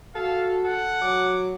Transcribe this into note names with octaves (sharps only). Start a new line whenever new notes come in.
F#4 A4 F5
A4 F#5
F#3 D6